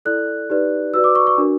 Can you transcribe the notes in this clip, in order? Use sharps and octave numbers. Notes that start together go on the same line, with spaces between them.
E4 A4 D5 F#6
D#4 G4 B4 D5
F#4 B4 D5 E6
D6
C#6
C#6
D4 F#4 A#4